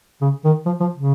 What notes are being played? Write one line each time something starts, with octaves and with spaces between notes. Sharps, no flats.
C#3
D#3
F3
F3
C#3